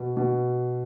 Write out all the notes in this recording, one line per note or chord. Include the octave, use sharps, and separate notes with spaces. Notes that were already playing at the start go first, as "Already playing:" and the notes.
Already playing: B2
B2